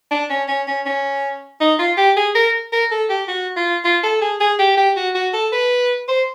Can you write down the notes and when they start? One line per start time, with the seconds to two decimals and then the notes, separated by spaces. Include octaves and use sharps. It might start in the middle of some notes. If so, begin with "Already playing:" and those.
0.11 D4
0.30 C#4
0.48 C#4
0.67 C#4
0.86 C#4
1.61 D#4
1.79 F4
1.97 G4
2.17 G#4
2.35 A#4
2.72 A#4
2.91 A4
3.10 G4
3.28 F#4
3.56 F4
3.85 F4
4.03 A4
4.22 G#4
4.41 G#4
4.59 G4
4.78 G4
4.96 F#4
5.15 F#4
5.33 A4
5.52 B4
6.08 C5